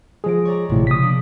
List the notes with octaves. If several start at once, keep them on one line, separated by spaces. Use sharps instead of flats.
F3 G#3 G#4 A#6 D7
C#5 D5 A#5
G#1 A2 C3 F3
C#3 D#6 B6
A#3 D4